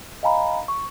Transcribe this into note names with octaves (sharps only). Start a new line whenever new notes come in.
D#5 F5 G#5 A#5 B5
C#6